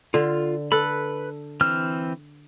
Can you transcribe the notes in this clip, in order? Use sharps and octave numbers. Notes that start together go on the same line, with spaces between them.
D3 F4
A4 B4 B5
E3 C4 F6